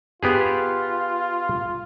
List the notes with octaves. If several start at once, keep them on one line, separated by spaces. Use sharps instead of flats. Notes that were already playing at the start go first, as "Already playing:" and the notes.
B3 F4 G4 G#4